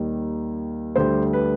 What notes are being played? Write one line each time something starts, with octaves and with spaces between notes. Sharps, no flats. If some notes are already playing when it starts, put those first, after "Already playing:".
Already playing: D#2 D#3 G3
D2 D3 G3 C5
B4